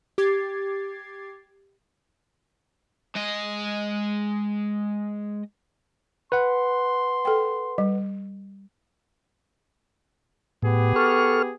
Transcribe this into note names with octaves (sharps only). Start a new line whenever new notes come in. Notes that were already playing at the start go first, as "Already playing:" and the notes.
G4 D6 G#6 A6 C7
G#3 D#5
B4 F#5 C6
A4 G5
G3
A2 B3 G4 G#4
A4 C#6 F6